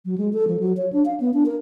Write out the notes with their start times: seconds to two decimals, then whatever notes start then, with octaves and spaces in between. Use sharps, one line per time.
0.05 F#3
0.18 G#3
0.33 A4
0.48 F3
0.60 F#3
0.77 C#5
0.93 D4
1.05 F5
1.20 B3
1.34 D4
1.46 A#4